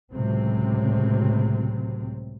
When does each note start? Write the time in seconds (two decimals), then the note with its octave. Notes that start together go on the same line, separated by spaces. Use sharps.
0.12 C#2 A2 C3 F#3 C4